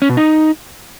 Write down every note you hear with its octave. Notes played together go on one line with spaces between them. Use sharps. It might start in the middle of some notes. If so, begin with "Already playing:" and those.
C#4
B2
D#4